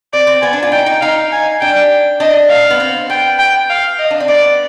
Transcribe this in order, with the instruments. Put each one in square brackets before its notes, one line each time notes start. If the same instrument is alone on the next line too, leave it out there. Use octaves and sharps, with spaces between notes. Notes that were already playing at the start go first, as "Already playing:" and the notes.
[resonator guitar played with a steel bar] C4 [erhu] D5
[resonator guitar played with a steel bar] C4
[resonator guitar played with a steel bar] B3 [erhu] G#5
[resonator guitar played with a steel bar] D4
F4
[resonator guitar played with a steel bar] D#4 [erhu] G5
[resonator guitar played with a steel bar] D#4
[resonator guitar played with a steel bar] D#4 [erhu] F5
[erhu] G#5
[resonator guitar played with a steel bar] D4 [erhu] G5
[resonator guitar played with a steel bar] D4 [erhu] D#5
[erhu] F5
[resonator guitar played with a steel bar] B3
C4
[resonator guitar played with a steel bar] B3 [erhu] G5
[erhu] G5
F5
D#5
[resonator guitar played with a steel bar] D4
C4
[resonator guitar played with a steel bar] B3 [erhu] D5